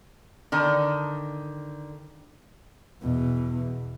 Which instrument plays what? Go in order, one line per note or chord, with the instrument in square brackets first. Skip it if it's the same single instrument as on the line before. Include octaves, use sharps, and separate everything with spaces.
[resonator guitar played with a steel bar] D3 D#3
[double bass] E2 B2